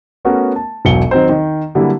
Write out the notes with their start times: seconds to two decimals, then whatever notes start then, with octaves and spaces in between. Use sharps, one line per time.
0.25 A3 B3 C#4 F#4 A#4
0.56 A5
0.85 E1 B1 F#3 C#7 G7
1.11 D#3 F#3 C4 D#4 C5
1.29 D#3
1.75 D3 F#3 G3 A#3 E4